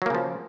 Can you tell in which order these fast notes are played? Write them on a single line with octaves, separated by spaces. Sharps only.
F#3 A#3 C#3 F3